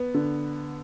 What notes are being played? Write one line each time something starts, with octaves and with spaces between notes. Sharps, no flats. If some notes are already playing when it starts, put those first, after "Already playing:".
Already playing: B3
D3